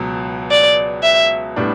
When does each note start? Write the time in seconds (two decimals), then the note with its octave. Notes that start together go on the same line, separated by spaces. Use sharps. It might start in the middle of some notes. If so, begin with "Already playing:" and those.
Already playing: C#2 B2 F#3
0.51 D5
1.03 E5
1.56 A2 G3 B3 D4